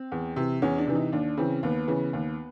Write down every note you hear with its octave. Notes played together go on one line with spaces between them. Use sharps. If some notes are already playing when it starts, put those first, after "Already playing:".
Already playing: C4
E2
C3 E3
E2 C#4
D4
C3 E3
D#4
D#2 D4
C#3 E3 C4
D#2 B3
C#3 E3
D#2